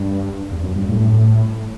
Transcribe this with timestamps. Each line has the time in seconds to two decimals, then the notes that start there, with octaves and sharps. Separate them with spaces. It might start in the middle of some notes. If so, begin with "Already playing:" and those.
Already playing: G2
0.52 E2
0.63 F#2
0.76 G2
0.89 A2